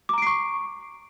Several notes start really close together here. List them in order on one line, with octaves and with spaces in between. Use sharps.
D6 A#5 D7 C7 C#6